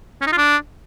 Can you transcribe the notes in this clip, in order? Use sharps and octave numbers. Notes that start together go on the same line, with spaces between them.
C#4
D#4
F4
D4